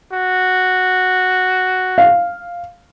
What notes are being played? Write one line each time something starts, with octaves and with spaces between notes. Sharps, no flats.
F#4
F5